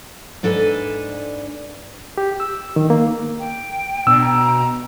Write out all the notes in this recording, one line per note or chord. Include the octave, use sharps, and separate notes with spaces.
G#2 D4 A4 B4 D5 G#5
G4
E6
D#3
A#3
G5
B2 D4 E6
A#5